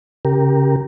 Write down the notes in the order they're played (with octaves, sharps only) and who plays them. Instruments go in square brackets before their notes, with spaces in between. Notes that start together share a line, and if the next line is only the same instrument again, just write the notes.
[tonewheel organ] C#3 G4 A#4